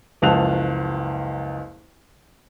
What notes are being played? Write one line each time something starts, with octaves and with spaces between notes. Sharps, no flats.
F#1 C#2 F3 A5 F#6 F7